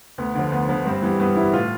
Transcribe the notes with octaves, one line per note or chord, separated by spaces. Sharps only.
D2 B3
D3 F3
D2 B3
D3 F3 B3
G2 C4
E3 G3 B3
G2 B3
E3 G3 E4
A2 F4